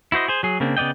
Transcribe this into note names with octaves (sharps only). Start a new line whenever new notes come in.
E4 F#4 C5 D#5
G#4 C5
F#3 G#4
C#3 A#3 C4 D4
C#3 B3 D5 D#5 G5